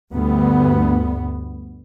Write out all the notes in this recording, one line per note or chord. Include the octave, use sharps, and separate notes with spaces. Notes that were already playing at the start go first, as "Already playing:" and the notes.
D2 G2 B3